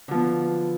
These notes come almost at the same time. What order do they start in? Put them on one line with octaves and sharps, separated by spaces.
D3 F3 B3